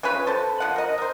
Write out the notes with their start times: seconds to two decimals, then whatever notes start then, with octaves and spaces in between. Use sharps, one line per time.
0.03 F3 C#4 G#4 B4
0.27 A4 B4 C5 A5
0.60 F3 F#5
0.76 A#4 D#5
0.98 A#4 C5